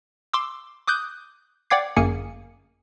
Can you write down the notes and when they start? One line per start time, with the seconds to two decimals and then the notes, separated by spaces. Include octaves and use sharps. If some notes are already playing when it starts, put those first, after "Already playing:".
0.34 C6 D6 E6
0.87 D6 D#6 F#6 G6
1.70 D5 F#5 G5 D6 G#6 C7
1.97 G1 F#2 A#3 G#4 G#5 C#7